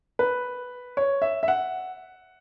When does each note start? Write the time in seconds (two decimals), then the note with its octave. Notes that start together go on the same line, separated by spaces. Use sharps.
0.19 B4
0.97 C#5
1.22 E5
1.43 E5
1.48 F#5